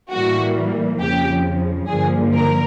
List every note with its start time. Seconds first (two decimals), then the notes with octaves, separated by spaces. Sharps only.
0.12 A2 E3 G3 A#3 F#4
1.00 F2 C#3 F3 G4
1.88 G2 D3 F3 A#3 G#4
2.32 A#4